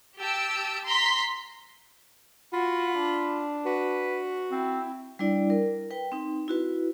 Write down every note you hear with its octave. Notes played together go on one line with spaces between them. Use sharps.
G4 A5 E6 D7
A#5 C6 B6
F4 F#4 B5
D4
F#4 B4
C4 E4
G3 D4 E4 D5
A#4
B4 G5
C4 D#4
E4 F#4 B4